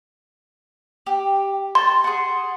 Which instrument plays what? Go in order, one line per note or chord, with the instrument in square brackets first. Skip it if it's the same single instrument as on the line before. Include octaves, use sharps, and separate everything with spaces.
[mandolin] G4
[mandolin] A5 [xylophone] C6
[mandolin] G#4 F#5